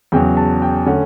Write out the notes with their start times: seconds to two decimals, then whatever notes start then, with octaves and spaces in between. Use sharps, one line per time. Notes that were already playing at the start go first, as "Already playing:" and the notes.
0.12 E2 C#3 F#3 G5
0.37 A5
0.62 G5
0.86 D3 A3 C#4 F#5